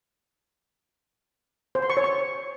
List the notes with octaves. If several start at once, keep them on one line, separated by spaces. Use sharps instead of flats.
C5
C6
C#6
C#5
C#6